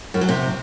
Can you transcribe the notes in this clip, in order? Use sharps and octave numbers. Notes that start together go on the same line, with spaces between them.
F#2
F#3
C3